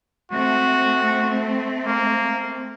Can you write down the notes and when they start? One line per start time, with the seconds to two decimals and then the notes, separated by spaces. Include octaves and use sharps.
0.32 A3 C4 F#4
1.86 A#3